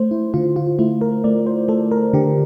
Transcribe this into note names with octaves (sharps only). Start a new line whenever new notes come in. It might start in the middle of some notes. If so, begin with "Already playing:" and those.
Already playing: A3 C5
E4
D3 F4
F4
A3 E4
A#4
A3 D5
C5
A3 A4
A#4
D3 G4